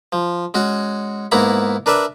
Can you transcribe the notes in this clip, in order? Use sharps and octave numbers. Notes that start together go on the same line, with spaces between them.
F3
G#3 C#4 F#4
G#2 A#3 B3 E4 A#5 B5
D4 A#4 B4 D5 E5